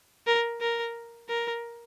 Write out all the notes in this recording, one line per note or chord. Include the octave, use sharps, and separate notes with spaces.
A#4
A#4
A#4